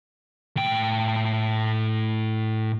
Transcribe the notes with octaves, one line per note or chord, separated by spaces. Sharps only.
A2 G5